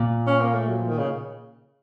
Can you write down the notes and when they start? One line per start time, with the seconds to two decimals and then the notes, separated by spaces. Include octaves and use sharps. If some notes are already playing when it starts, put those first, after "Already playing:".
Already playing: A#2
0.27 C#4
0.41 A#3
0.54 A3
0.68 F#3
0.77 F3
0.88 D#3
0.98 C#3